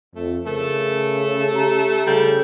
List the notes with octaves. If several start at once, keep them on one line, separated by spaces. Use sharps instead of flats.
F2 A3
C#3 A3 A#4
G4 A#5
C#3 G3 A4